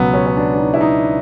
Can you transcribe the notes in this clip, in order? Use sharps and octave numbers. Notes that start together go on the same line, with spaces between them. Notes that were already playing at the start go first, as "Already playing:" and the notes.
Already playing: C#2 B2 F#3 B3
C#4
C#4
D4
D4
D#4
E4
D#4